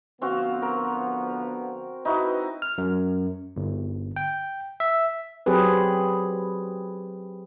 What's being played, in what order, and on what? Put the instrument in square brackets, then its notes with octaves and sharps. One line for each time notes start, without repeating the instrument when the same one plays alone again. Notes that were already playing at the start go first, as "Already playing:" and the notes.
[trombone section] D3 F3 B3 [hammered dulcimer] C4 F#4 F5
[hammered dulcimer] A#4
[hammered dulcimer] D#4 E4 F#4 [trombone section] B4
[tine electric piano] F6
F#2
G1
G5
E5
[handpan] F#3 C4 G4 G#4 B4